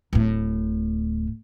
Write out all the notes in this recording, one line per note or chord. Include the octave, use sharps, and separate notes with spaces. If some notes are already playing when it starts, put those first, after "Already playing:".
D1 A2